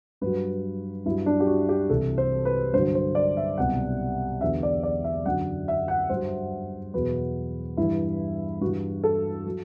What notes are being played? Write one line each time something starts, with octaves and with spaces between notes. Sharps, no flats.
G2 F#3 B4
G2 F#3 E4
D4
G4
F#4
G4
C2 C3 E3 A4
C5
B4
G2 D3 F#3 C5
C5
D5
E5
C2 B2 F#3 F#5
E2 D3 F#3 E5
D5
D5
E5
F#2 D3 F#3 F#5
E5
F#5
G2 F#3 C5
E2 B2 F#3 B4
G2 E3 E4
G2 E3 F#4
A4
F#3